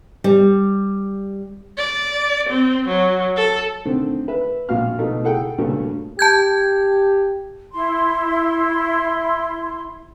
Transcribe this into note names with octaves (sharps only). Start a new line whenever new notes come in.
G3
D5
C4
F#3
A4
D3 D#3 A3 C4
B4 E5
A#1 A#2 F4 F#4 F5 F6
B2 A3 D#4
E4 G#4 A4 F#5 G5
G2 A#2 C#3 A3 F#4
G4 A5 G6 G#6
E4 C6